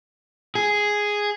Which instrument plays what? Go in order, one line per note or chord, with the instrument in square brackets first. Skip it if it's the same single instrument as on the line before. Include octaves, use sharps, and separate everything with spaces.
[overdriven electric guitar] G#4